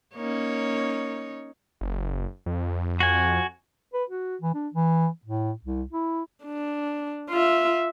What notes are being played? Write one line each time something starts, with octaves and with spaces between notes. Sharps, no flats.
A#3 C#4 D#4 C#5
F#1
F2
F#4 G#5
B4
F#4
E3
D4
E3
A2
C2
E4
D4
F4 E5